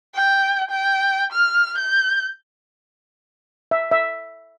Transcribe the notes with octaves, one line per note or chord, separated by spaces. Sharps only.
G5
G5
F6
G6
E5
E5